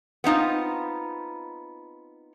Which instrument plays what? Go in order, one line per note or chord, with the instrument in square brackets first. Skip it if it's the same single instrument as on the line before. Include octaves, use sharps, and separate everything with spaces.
[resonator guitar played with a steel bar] B3 C4 D#4 F4